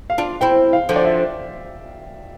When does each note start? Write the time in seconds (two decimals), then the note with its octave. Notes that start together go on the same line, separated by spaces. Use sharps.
0.10 F5
0.18 D4 F4
0.41 C4 E4 G5
0.73 F5
0.89 D3 F3
0.96 D5
1.05 E5